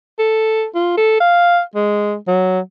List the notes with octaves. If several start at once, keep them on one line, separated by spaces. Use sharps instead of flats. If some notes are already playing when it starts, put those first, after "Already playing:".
A4
F4
A4
F5
G#3
F#3